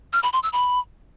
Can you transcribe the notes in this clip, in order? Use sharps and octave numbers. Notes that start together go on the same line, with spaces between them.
F6
B5
C6
E6
B5